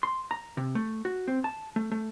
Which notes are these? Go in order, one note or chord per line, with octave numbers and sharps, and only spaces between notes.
C6
A#5
C3
A3
F#4
C4
A5
A3
A3